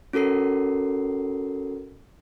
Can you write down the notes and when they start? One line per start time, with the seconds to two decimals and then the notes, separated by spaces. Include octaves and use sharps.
0.13 C#4 F#4 A4 A#4 C7